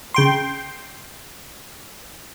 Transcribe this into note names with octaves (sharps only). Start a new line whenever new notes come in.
C#3 G5 C6